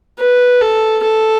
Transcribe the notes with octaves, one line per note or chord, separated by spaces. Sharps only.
B4
A4
A4